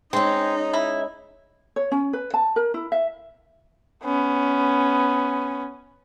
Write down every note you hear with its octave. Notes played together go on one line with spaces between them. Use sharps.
G#3 C4 C#4 D#4
E4
C#5
C#4
B4
A5
A#4
E4
E5
B3 C#4